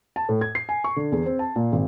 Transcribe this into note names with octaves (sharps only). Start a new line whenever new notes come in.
A5
A2
G#6
C7
G#5
C#6
D3
E2
C4
A5
A#2
G#1